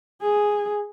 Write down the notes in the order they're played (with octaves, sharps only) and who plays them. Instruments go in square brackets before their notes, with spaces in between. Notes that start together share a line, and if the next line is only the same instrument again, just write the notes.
[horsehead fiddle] G#4